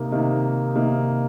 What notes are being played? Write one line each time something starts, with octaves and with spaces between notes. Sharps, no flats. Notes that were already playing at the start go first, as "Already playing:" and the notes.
Already playing: C3 A#3 D#4
C3 D#3 A#3 D#4
C3 D#3 A#3 D#4